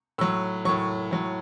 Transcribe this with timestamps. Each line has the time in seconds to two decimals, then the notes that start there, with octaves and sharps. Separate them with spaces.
0.18 A2 F#3 E6
0.65 A2 F#3 C#6
1.11 A2 F#3